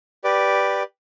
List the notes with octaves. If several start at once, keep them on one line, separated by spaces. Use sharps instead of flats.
G4 B4 D5